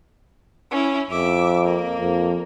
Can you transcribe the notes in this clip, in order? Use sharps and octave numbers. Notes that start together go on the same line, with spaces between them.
C#4 E4
F2 E5 D6
A#3
F2